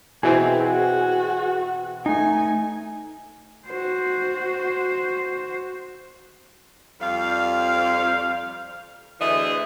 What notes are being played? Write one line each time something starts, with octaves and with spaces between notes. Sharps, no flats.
B2 E3 C4 G#4
F#4
A3 D#4 G#5
F#4 C5
F2 G3 F5
D2 D3 E3 G#4 D#5 E5